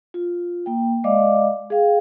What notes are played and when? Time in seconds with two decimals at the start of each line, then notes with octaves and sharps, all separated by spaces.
0.14 F4
0.66 A#3 G5
1.04 G#3 D5 D#5 F5 D6
1.70 G#4 F5 G5